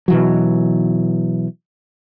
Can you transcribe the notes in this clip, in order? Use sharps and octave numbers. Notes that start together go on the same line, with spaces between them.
B2 E3 F#3